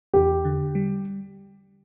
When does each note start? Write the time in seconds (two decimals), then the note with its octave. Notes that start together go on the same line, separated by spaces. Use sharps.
0.14 E2 G4
0.45 D3
0.75 G3